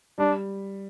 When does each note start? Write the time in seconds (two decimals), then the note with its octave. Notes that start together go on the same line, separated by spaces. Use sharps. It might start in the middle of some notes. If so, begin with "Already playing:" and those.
0.18 G3 D4